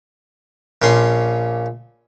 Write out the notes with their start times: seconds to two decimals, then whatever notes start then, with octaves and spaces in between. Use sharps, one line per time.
0.82 A#1 A#2 C#4 C6